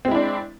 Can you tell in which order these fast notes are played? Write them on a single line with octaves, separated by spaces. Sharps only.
C4 G#3 E4 D4